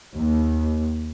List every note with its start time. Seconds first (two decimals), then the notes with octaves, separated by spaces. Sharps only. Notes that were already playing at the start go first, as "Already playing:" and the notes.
0.15 D#2